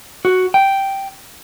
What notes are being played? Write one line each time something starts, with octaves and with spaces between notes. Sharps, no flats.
F#4
G5